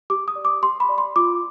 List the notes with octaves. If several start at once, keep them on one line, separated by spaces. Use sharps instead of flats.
G4 D6
D#6
D5
D6
G4 C6
B5
D5
C6
F4 D6